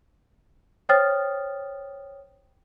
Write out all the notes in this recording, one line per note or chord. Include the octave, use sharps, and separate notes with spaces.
C5 C#5 G5 D#6 F6 A6